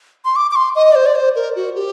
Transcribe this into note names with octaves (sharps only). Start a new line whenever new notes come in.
C6
D6
D6
C6
D#5
D5
C5
D5
C5
A#4
F#4
G4